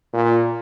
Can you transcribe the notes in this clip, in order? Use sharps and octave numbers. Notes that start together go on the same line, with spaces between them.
A#2